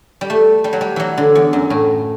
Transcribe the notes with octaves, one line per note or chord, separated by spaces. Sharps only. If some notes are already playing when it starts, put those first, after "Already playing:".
G3
A3
G3
F#3
G3
E3 F#3
D3
E2
F#2
A2